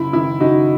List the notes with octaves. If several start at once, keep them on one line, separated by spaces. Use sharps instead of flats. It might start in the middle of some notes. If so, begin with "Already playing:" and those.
Already playing: F#1 E4
F#2 D#3 E4
F#1 D#4 F#4